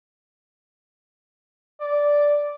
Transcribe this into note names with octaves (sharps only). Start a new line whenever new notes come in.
D5